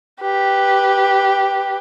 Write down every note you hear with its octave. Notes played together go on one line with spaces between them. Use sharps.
G4 B4